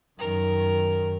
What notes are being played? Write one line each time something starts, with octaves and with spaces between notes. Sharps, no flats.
F#2 D#3 A#4